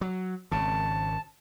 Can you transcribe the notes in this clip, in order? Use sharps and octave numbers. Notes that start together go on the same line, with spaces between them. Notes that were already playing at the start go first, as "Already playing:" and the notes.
F#3
G#1 C#3 A5